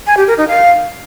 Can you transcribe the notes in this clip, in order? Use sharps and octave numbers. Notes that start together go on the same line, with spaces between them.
G#5
G4
A#4
D#4
F5